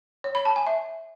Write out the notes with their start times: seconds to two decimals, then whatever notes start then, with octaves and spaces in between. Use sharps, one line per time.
0.24 C#5
0.35 B5
0.45 A5
0.56 G#5
0.67 E5